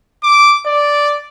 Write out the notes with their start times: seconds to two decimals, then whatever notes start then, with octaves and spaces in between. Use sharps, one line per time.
0.23 D6
0.66 D5